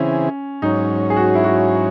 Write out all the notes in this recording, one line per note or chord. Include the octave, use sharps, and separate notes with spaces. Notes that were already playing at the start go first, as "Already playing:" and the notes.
Already playing: C#3 E3 C4 C#4 E4 G#4
G#2 F#3 C#4 D#4
G#4
F#4
E4
F#4